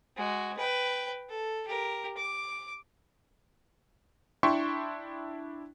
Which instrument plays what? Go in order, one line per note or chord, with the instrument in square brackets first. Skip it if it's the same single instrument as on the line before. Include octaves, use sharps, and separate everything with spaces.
[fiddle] G#3 F#4
B4 G5
A4
G4 A#4
D6
[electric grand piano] D4 E4 E5 G5 C6 C#6